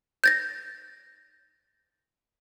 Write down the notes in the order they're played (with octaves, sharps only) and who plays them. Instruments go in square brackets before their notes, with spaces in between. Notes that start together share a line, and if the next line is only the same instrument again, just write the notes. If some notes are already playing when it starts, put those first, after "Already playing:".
[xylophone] G6 A6 A#6